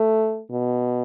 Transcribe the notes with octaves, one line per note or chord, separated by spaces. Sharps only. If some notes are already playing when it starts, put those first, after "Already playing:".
Already playing: A3
B2